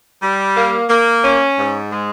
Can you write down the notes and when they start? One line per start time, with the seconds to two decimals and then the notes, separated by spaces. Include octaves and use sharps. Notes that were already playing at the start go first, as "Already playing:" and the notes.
0.22 G3
0.56 A#3
0.90 A#3
1.23 C#4
1.57 G#2
1.92 G#3